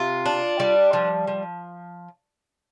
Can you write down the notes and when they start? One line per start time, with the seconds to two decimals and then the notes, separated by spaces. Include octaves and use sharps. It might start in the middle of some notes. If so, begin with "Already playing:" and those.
Already playing: C3 F4
0.26 D4
0.60 G3
0.93 F3
1.27 F3